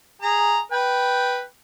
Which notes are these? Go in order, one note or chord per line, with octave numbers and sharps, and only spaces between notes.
G#4 A#5
B4 G5